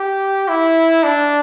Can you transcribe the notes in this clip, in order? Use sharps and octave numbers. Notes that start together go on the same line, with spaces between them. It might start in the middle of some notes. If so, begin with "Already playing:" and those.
Already playing: G4
E4
D4